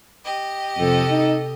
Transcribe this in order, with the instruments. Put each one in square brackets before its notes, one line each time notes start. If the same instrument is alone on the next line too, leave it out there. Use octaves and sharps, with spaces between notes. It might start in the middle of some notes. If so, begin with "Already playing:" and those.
[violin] G4 D#5
[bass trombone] F2 [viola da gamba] C3 A4
[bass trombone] D#4